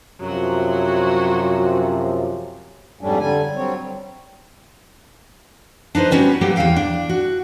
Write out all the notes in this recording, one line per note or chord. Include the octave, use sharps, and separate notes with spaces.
F#2 C3 F3 F#3 F#4
F2 G#2 G3 A3 C#4 D4
D3 G3 G#5
F#3 G3 C4 C#5
D4 D#4 B4 C5
G3 B3 C#4 F#4 B4
F#3 G3 A#3 B3 G4 F#5
E2 G#2 F3 F5 G5
D4
F#4